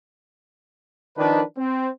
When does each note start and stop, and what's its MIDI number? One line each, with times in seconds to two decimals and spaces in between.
1.17 1.42 51
1.17 1.42 53
1.17 1.42 62
1.17 1.42 71
1.58 1.89 60